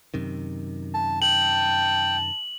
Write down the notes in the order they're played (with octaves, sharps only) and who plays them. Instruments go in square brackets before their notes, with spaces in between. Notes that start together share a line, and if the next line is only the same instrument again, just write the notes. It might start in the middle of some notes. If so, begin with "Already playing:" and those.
[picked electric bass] F#2 C3 D#3
[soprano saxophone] A5
[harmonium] G5 [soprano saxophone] A5 [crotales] F#7